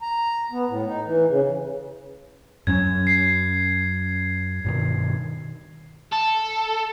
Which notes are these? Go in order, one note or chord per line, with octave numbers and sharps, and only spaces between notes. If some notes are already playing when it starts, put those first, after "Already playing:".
A#5
B3
A2
D#4
E3
C#3
F#2 F#3 C#4 G#6
C7
G2 B2 D#3
A4